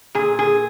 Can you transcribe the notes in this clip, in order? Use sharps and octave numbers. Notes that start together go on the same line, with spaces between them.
A#2 G#4
G#4